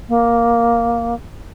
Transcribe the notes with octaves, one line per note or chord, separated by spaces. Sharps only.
A#3